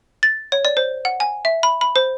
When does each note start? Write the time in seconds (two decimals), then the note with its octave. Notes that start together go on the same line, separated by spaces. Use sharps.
0.23 A6
0.52 C#5
0.65 D5
0.77 C5
1.05 F#5
1.20 G#5
1.45 E5
1.63 B5
1.81 B5
1.96 C5